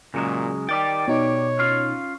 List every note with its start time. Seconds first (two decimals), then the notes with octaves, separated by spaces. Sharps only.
0.14 A#2 C#3 F#3 G#3
0.69 D#3 G4 D5 G5 A6
1.08 B2 D#4 C#5
1.59 C#4 F4 F5